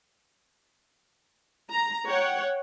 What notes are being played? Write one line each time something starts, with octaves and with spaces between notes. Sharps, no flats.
A#5
C#5 F#5 G5